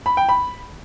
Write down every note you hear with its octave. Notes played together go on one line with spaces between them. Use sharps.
B5
G5
B5